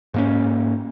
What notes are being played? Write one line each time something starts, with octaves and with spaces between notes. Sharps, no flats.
G#2 A#3 C#4